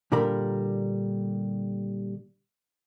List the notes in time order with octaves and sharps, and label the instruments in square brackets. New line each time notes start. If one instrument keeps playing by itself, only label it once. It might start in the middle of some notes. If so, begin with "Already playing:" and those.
[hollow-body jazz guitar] A#2 D3 G3 A#4 B5